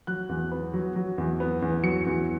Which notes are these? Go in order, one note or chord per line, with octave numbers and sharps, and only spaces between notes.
F#3 F#6
E2
B3
F#3
F#3
E2
B3
E2
F#3 C#7
E2